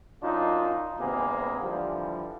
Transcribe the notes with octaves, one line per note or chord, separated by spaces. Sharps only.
F#2 D4 D#4 F4
G#1 G2 C3 A#3 B3 G#4
D3 E3 F3 G3